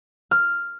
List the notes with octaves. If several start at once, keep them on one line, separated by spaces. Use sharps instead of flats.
F6